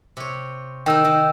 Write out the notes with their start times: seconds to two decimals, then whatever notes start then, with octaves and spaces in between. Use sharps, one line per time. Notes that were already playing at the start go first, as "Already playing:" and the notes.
0.17 C3 C#5
0.86 D#3 A#4 G5 E6
1.04 D#3